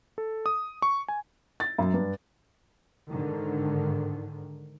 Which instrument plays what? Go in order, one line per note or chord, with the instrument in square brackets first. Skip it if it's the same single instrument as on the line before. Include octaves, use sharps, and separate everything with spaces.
[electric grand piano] A4
D#6
C#6
G#5
[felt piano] A6
F#2
G2
[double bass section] G#2 D3 D#3